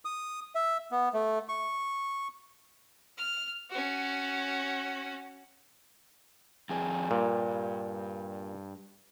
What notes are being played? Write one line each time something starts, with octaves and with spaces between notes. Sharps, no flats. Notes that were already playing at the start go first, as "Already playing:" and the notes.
D#6
E5
B3
A3
C#6
F6
C#4 F#4
F2 G#4
G2 A#2